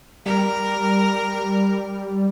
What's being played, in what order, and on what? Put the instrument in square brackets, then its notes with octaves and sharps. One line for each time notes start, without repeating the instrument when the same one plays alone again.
[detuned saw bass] G3 [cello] A#4